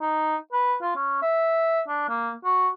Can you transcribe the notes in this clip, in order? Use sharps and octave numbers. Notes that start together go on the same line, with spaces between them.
D#4
B4
F4
C#4
E5
D4
A#3
F#4